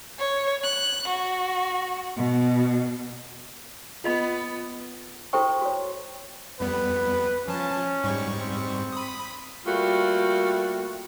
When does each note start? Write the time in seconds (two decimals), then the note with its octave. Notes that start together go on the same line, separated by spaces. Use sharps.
0.18 C#5
0.63 F#6
1.09 F#4
2.15 B2
4.04 B3 F4 D#5 B5
5.33 E4 F#4 A4 C5 G5 C#6
5.61 F#4 C#5
6.60 F2 G3 B3 B4
7.48 F3 C#4 A5
8.04 G#2 G3 C#6
8.40 C4
8.92 B5 D#6
9.66 G3 A3 A#3 F4 F#4